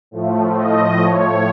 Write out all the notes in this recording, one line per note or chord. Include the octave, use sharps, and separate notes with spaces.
A2 F3 A3
D#5
C#5